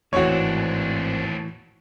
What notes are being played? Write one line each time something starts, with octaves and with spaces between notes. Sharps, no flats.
G#1 D#2 A2 E3 C4 D4 F#4 C#5